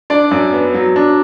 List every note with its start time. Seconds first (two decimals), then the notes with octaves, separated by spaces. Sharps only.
0.10 D4 D5
0.31 F#2
0.53 B3
0.74 F#3
0.96 D4